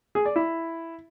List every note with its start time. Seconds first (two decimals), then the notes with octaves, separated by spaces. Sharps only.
0.15 G#4
0.25 D5
0.36 E4